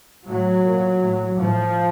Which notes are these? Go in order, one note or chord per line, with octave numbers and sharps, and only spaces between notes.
A2 F#3
A#2
A2
A2 F3